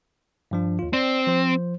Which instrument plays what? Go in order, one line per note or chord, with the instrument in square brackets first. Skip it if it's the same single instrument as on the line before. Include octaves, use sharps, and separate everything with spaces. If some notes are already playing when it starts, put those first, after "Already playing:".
[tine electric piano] G2 F3 D4
D#2 F4
[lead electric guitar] C4 [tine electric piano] D5
[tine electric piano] F3 C5